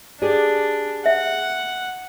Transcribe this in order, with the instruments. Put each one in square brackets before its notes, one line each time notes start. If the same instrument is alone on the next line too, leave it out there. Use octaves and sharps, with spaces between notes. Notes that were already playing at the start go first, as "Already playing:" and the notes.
[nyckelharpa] D4 [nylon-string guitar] G4 G#4 D5
[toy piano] E5 [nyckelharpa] F#5